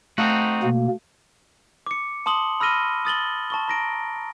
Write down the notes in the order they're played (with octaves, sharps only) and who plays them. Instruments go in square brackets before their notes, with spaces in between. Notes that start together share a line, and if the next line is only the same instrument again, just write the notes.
[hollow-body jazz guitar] A3 F5 [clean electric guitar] C4 D#4 F#4
[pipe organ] B2 A#3
[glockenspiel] D6 C#7
A5 C6 D#6 F#7 G7
B5 E6 F6 A#6 D#7 G7
D#6 A6 F#7 G7
A5 C#6 G7
A#5 A#6 D7